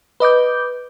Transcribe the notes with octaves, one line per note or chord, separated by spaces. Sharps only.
B4 D#5 D6 G6